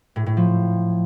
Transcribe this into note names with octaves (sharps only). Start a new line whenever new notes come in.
A2
A2
F3